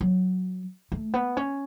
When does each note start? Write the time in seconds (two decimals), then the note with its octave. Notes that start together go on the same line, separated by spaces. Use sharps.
0.01 F#3
0.92 A3
1.14 B3
1.37 C#4